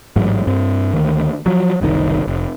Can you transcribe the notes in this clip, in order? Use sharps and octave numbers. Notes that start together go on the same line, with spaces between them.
A1 G#2 F#3
G2 C4
D2 D#3
F3 F#3
F#1 C2 B2 D#3
F1